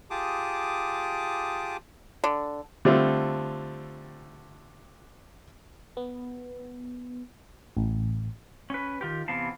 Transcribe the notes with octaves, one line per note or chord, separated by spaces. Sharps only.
F4 G4 G#4 A5 D6 D#6
D3
D3 G3 A3 C4 F4
B3
A1
C#4 B4
D#3 F4 G4
C3 E3 B3 F5 A5